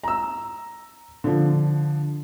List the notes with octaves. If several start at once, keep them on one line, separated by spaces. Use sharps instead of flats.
A#5 E6
D3 F3